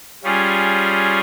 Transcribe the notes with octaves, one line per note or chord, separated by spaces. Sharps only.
G3 C#4 F4 G#4